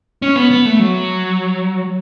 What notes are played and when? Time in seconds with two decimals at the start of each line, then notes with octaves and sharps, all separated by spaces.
0.22 C#4
0.36 B3
0.51 B3
0.65 A3
0.79 F#3